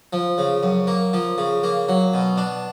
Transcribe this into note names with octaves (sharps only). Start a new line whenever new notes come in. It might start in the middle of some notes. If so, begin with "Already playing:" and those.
F3
C#3
F#2
A#3
F3
C#3
A#3
F#3
B2
D4